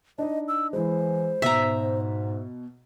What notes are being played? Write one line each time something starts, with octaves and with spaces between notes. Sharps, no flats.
D4 D#4 D#5
E6
E3 G#3 E4 C5
G#2 B2 E5 A#5